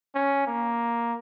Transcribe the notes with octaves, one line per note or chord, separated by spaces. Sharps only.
C#4
A#3